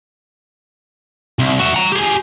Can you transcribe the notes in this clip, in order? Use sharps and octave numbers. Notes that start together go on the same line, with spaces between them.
C2
F#4 E5
F#5 A#5
G4 G#4